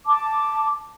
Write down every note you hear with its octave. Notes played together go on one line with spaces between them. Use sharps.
A5 D6